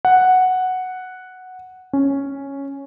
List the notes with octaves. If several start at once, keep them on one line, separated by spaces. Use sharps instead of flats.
F#5
C#4